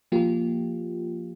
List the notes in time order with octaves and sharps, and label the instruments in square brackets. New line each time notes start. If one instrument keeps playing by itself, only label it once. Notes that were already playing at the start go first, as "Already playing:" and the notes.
[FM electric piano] F3 A#3 F4 G4